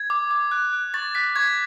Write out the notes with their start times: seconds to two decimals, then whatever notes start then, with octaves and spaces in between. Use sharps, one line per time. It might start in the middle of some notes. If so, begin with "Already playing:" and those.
Already playing: G#6
0.10 D6
0.31 D6
0.52 F#6
0.73 F#6
0.94 C#6 A6
1.15 F#6 B6
1.36 C#6 G#6